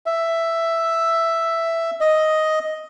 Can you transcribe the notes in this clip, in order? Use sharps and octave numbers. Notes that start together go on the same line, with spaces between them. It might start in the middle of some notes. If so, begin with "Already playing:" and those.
E5
D#5